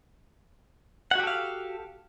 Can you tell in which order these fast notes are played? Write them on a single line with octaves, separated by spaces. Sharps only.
F#5 F#4 G4 A4 F5